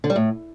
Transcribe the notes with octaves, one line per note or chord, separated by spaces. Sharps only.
D3
G3
A2